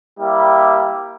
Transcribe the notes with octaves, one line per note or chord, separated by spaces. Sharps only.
G3 A#3 E4 G4